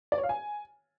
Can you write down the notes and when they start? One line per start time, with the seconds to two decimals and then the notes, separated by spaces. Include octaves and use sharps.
0.12 D5
0.18 C#5
0.24 F5
0.29 G#5